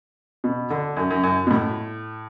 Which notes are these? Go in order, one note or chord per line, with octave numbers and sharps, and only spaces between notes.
B2
D3
F#2
F#2
F#2
B2
A2